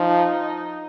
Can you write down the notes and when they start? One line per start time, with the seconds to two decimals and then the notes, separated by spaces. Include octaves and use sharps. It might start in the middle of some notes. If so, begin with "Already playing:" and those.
Already playing: F3 D#4